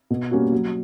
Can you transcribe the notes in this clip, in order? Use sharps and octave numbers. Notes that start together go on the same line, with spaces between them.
B2
G3 A#3 C#4 F#4
F#3